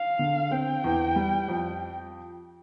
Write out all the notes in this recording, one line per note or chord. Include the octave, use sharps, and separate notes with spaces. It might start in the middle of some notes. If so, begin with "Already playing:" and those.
Already playing: F5
D3
C4 G5
E2
G3
F2